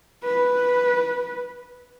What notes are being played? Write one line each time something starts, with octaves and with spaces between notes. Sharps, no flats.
B4